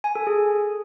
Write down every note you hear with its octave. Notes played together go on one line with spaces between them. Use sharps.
G#5
A4
G#4